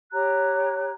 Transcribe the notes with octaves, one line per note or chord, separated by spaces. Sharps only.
G4 C#5 A#5 F#6